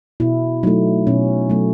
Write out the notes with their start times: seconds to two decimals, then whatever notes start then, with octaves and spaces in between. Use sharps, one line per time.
0.20 B2 E4
0.63 F#3 A3 D#4
1.07 B2 C#4
1.49 F#3 A3